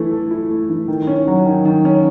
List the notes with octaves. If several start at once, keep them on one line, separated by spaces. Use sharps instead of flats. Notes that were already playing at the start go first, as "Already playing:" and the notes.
Already playing: E3 A3 E4
A4
E4
A3
E3
D#3
C#4
F#3
D#3
D#3
C#4